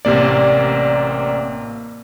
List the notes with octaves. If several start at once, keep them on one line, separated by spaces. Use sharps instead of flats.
A1 C3 A#3 D5